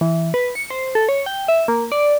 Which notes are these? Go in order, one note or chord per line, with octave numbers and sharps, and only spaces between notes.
E3
B4
C#7
C5
A4
C#5
G5
E5
A#3
D5